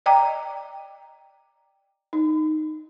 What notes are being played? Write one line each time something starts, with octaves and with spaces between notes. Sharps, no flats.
D5 D#5 G5 A#5 D6
D#4